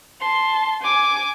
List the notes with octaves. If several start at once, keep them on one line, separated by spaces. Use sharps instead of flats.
A5 C6
G#5 D6